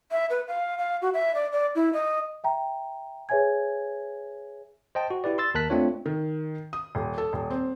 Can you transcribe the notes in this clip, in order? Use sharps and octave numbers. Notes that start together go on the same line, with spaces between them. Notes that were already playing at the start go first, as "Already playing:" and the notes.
E5
B4
F5
F5
F#4
E5
D5
D5
E4
D#5
E5 G5 A#5
G#4 B4 C#5 E5 G#5 G#6
C5 D#5 G5 A5
F#4
E4 G4 B4 D5
C6 E6 A6
D#2 A#4 A5 F#6 B6
A3 C4 D4 F4 C#5
D#3
D#6
D#1
A4
D#1
C4